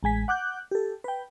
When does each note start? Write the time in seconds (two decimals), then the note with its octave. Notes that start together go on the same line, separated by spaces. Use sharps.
0.03 A1 G#3 G#5 B6
0.28 F#5 D6 F#6 G6
0.71 G4 A4
1.04 B4 G5